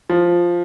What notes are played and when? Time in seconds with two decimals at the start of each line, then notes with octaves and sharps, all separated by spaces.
0.09 F3